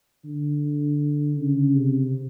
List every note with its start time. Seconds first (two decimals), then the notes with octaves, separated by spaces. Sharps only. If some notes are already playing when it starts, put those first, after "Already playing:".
0.24 D3
1.37 C#3
1.75 C3